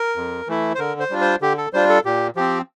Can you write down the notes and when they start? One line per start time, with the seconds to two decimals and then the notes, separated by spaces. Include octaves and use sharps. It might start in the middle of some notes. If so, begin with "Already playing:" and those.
Already playing: A#4
0.16 F2
0.48 E3 A3 E4
0.75 C5
0.79 D3 A#4
1.00 C5
1.10 G3 D4 F4
1.21 C5
1.42 D3 G4
1.58 A4
1.73 G3 D4 F4 C5
1.89 A4
2.05 A#2 G4
2.36 F3 C4 G4